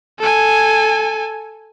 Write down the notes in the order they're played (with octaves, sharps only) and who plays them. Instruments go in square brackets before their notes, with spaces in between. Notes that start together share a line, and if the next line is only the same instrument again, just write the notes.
[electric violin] A4 G#5